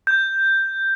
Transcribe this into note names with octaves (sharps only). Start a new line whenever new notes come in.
G6